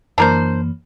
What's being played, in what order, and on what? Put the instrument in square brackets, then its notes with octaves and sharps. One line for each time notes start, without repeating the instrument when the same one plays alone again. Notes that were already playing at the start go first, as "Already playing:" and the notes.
[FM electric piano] F#2 E3 A#3 [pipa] D4 A#4 C5